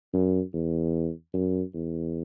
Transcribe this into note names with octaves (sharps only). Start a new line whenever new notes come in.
F#2
E2
F#2
E2